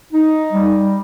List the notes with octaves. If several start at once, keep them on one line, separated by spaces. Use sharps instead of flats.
D#4
G3